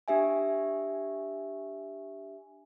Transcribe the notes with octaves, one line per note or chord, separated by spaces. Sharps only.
D4 G4 E5 G#5